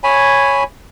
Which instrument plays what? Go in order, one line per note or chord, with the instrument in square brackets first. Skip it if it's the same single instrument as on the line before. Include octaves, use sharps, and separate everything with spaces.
[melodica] C#5 G#5 B5